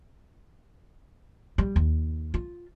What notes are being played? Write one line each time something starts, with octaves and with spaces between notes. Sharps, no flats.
G3
D#2
F4